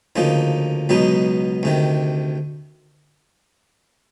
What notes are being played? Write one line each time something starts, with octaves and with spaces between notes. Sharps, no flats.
D2 C#3 F3 A#3 D#4
C#2 B2 F#3 B3 D#4
D2 C3 D#3